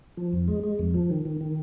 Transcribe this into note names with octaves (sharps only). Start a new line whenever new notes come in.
F3
F2
G#3
G#3
F2
F3
D#3
D#3
D#3